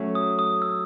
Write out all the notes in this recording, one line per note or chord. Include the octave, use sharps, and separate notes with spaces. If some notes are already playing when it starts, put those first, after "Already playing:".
Already playing: F#3 A3 C#4
D#6
D#6
E6